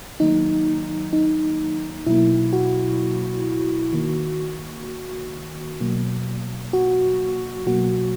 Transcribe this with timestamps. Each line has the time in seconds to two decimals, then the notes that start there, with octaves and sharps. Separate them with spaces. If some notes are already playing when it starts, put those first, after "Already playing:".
0.20 D#3 F#3 A#3 D#4
1.13 D#4
2.06 B2 F#3 A#3 E4
2.53 F#4
3.93 D#3 A#3
5.80 B2 F#3 A#3
6.73 F#4
7.66 B2 F#3 A#3 F#4